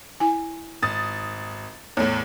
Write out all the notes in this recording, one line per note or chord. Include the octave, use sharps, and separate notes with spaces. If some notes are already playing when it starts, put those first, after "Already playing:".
E4 G#5
G#1 D#6 A6
E2 A2 C#5